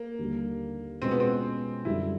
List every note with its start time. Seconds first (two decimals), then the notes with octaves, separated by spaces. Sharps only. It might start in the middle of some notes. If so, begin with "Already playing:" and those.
Already playing: A#3
0.19 D#2 D3 G3
1.02 B2 G#3 C4 C#4 F4
1.11 B3
1.20 C4
1.85 F#2 D3 G3 E4